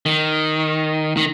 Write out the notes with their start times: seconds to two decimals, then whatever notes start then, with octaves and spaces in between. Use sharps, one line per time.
0.06 D#3
1.17 D#3